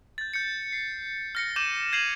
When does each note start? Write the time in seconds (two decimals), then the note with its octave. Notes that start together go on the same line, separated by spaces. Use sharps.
0.18 G6 A6
0.34 G6 C#7
0.73 C7
1.35 F6 A#6 C#7
1.56 D6 G6 A6 D#7 E7 F#7
1.92 G6 G#6 C7 D#7 F7 F#7